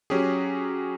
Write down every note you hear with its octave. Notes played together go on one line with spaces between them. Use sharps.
F#3 C#4 G4 G#4